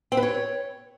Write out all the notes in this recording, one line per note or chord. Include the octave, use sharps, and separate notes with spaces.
C4
B4
C#5